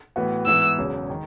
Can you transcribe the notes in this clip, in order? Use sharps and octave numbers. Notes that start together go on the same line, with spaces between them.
A2 E3 B3 F#4 B4
G#2 E3 B3 E6
E1 E2 C#3 F#3
D#3